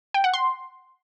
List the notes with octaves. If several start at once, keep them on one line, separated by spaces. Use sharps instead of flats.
G5
F#5
C6